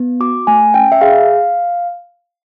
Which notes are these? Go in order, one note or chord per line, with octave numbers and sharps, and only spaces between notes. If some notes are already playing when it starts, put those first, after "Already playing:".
Already playing: B3
F#4 D6
A3 G#5
C#4 G5
E5
G#4 F5